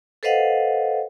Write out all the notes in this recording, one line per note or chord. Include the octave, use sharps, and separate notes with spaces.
A4 B4 C5 D#5 F5 F#5